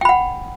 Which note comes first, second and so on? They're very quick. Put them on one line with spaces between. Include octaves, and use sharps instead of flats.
G5 B5 F#5